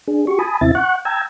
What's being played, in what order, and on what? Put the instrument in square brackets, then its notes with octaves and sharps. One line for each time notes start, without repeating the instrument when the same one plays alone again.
[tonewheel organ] D4 G#4
F#4 G4 C#6
G#5 A5 B5 D#6
D#2 C3 C4 E4 E5 A6
F#5 C#6 F#6
G5 A5 A#5 E6 G#6